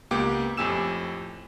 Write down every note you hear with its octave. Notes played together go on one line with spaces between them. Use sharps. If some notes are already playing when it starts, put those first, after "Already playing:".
C#2 A#3 B3 G4 D6
F2 A2 G4 G#5 E6 E7